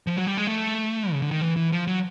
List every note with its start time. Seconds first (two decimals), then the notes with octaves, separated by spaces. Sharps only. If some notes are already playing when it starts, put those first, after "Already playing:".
0.07 F3
0.17 F#3
0.27 G3
0.37 G#3
0.47 A3
1.12 C#3
1.22 D3
1.31 D#3
1.41 E3
1.56 E3
1.72 F3
1.87 F#3